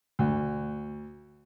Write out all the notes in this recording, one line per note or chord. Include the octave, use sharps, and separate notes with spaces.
D2